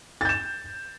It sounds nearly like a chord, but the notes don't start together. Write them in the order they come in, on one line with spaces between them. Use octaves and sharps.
A6 G6 E7